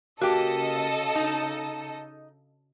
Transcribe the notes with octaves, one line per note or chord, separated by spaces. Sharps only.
C#3 A#3 F#4 G4 A4 D#5
D#4